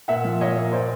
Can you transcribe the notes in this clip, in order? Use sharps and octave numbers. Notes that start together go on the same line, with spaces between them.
A#2 E5 F#5
F3
A#2 C#5 D#5
A#3
A#2 C5 D5